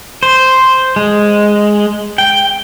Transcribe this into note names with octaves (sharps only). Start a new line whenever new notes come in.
C5
G#3
G5